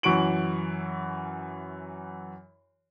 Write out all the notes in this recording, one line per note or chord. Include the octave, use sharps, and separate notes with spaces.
F#2 E3 F#4 C#6 D7 F#7